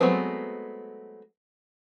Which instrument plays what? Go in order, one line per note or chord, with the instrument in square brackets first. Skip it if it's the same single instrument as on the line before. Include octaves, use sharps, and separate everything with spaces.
[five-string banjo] F#3 G#3 A3 B3 C4